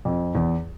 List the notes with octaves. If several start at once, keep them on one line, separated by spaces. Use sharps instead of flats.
F2
E2